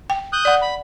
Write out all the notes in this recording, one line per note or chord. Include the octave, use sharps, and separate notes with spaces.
G5
D#6 F#6 G6
D5 F#5
B5